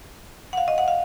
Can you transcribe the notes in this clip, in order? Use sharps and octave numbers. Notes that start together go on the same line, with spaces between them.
F#5
F5
D#5
F#5
F5